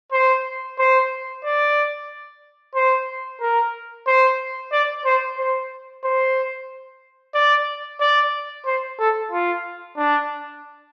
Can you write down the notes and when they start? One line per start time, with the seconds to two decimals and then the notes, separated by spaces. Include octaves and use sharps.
0.12 C5
0.78 C5
1.45 D5
2.75 C5
3.41 A#4
4.07 C5
4.72 D5
5.05 C5
5.38 C5
6.04 C5
7.34 D5
8.00 D5
8.66 C5
8.99 A4
9.32 F4
9.97 D4